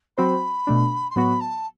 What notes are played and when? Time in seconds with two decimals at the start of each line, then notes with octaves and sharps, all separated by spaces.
0.17 F#3 C4 F#4 C5 B5
0.67 B2 A3 D4
1.10 C6
1.16 A2 F#3 B3 F#4 B5
1.41 A5